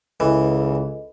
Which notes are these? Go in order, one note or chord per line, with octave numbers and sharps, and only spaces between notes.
C#2 E3 A4 B4 D#5